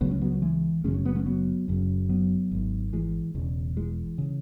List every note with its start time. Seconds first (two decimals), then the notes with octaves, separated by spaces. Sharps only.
0.01 C#2 C#3 F#3 B3
0.11 G#3 C#4
0.21 F#3 B3
0.32 F#3
0.42 E3 G#3
0.84 F#1 F#2 C#3 G#3 C#4
0.94 C#4
1.05 F#3 B3
1.15 G#3 C#4
1.26 F#3 B3
1.68 F#1 F#2 C#3
2.09 F#3 B3
2.51 G#1 G#2
2.93 E3 G#3
3.35 E1 E2 C#3
3.77 E3 G#3
4.18 C#3